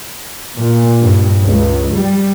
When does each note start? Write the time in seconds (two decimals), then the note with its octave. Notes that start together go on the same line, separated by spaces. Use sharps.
0.56 A#2
0.99 G2
1.44 C#2
1.93 G3